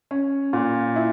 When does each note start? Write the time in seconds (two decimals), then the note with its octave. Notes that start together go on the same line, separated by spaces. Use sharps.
0.11 C#4
0.53 A#2
0.96 E4